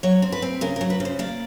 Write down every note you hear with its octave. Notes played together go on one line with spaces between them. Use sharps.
F#3 C#5
C4
B4
C4
C#3 A#4
A#4
F#3
B4
C#3
C5
A#3 D5